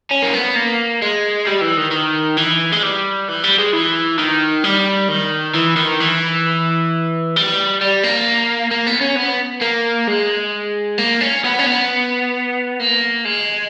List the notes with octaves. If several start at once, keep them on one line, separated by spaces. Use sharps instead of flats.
C#4
A#3
B3
A#3
G#3
G3
E3
D#3
D#3
E3
G#3
G3
E3
G3
G#3
E3
D#3
G3
D#3
E3
D#3
E3
G3
G3
A#3
A#3
B3
C#4
B3
A#3
G#3
A#3
C#4
B3
C#4
B3
A#3
G#3